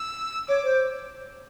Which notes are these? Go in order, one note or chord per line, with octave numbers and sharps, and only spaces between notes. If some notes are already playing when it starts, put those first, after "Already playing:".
Already playing: E6
C#5 D6
C5